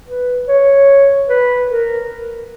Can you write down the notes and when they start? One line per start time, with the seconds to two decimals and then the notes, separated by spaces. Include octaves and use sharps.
0.08 B4
0.48 C#5
1.28 B4
1.69 A#4